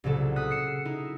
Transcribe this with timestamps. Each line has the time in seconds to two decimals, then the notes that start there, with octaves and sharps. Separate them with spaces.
0.04 C2 A#2 C#3 F#3 A4
0.36 D#6 F#6 B6
0.51 C7 C#7 E7
0.85 D#4 E4